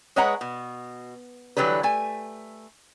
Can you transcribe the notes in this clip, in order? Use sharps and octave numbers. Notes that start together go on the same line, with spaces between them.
G#3 B4 C#5 D#5 F#5 A#5
B2
D3 E3 F#3 G3 B4
A3 G#5